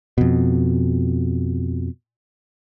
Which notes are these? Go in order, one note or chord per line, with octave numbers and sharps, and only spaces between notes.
F2 B2